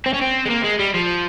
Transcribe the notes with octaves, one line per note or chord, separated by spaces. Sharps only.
C4
C#4
C4
G#3
A#3
G#3
G3
F3